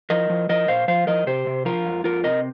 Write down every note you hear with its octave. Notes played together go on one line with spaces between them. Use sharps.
F3 A#4 D#5
F3
F3 A#4 D#5
A#2 C5 F5
F3 C5 F5
F3 A#4 D#5
C3 G4 C5
C3
F3 F4 A#4
F2
F2 F4 A#4
C3 A#4 D#5